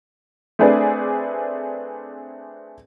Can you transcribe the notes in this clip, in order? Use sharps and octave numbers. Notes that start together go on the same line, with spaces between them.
A3 C4 D4 G#4 B4 D5